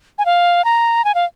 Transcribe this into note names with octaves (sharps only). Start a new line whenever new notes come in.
G#5
F5
A#5
G#5
F5